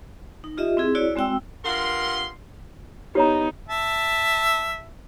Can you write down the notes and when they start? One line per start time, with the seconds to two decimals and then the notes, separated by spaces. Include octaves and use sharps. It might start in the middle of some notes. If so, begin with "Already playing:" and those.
0.44 D#4
0.57 F4 G4 D#5 E5
0.77 C4 E4 G#4
0.95 E4 F#4 C#5 D5
1.16 G#3 C4 F#4 G5 E6
1.65 G2 F4 A#4 F#5 C6
3.15 B3 D#4 G4 C#5 A#5
3.69 E5 A5